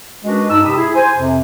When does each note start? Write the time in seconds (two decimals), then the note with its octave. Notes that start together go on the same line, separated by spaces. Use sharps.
0.24 G#3 C#4 D4 F#4 A#4 B4
0.50 G2 D#4 A5 E6
0.64 C3 G4 B5 D#6
0.77 E4 G#4
0.94 C5 G#5
1.16 F2 C3